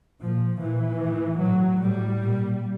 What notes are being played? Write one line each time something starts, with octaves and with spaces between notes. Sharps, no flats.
A#2 F3
A#2 E3
A2
A2 F#3
A2 G3
A#2